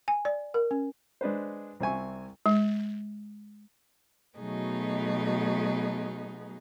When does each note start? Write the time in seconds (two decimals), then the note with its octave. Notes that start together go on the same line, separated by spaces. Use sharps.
0.08 G#5
0.25 D5
0.54 A#4
0.71 C#4
1.21 G#3 D4 B4 C5
1.80 C2 C4 E5 G#5 C#6
2.46 G#3
4.37 B2 F#3 A3 B3 D#4 G#4